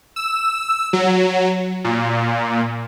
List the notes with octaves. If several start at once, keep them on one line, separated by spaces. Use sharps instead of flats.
E6
F#3
A#2